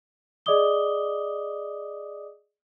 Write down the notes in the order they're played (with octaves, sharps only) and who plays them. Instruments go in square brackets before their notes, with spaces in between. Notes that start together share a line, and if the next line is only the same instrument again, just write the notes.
[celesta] G#4 D5 D#5 D6 D#6 G7